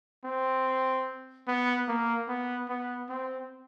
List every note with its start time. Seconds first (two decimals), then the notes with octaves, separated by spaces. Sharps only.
0.25 C4
1.48 B3
1.88 A#3
2.28 B3
2.69 B3
3.09 C4